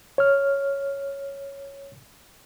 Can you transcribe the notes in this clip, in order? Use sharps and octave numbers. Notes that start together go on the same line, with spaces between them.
C#5 F6